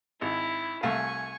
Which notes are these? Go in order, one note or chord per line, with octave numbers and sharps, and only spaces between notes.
G#1 E4
C2 A3 F5 G#5 C#6